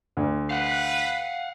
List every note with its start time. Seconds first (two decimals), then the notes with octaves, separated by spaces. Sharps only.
0.17 D2
0.50 B4 F5 F#5